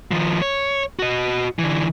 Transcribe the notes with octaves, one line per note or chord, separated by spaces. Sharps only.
D#3 F3
C#5
F#4 D#5
D3 E3